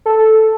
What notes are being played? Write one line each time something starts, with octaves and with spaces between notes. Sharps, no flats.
A4